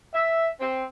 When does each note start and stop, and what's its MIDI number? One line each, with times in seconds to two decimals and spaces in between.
0.14 0.48 76
0.60 0.84 60